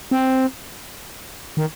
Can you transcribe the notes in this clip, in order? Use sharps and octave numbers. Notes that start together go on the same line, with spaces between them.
C4
D#3